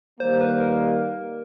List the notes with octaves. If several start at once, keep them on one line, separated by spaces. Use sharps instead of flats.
D#3 G3 A#3 C5
B4
A#4